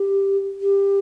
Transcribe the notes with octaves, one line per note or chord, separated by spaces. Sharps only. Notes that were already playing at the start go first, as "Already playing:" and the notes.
Already playing: G4
G4